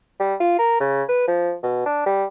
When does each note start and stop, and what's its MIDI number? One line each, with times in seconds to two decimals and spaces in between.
0.20 0.35 55
0.40 0.55 65
0.59 0.77 70
0.80 1.03 49
1.09 1.25 71
1.28 1.54 53
1.63 1.84 47
1.86 2.04 62
2.06 2.25 55